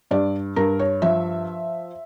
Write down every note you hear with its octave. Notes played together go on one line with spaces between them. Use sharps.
G2 D5
G2 A#4
C#5
F3 E5